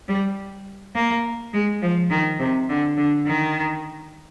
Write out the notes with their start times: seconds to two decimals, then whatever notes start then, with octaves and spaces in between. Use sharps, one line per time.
0.08 G3
0.95 A#3
1.53 G#3
1.82 F3
2.10 D#3
2.39 C3
2.69 D3
2.97 D3
3.26 D#3